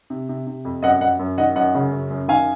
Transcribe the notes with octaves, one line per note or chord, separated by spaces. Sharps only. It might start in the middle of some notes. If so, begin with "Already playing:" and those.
C3
C3
C3
F2
F#2 D#5 F#5
F#2 D#5 F#5
F#2
D#3 D#5 F#5
F#2 D#5 F#5
C#3
F#2
F#2
D#3 F5 G#5